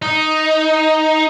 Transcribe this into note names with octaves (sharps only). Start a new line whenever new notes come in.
D#4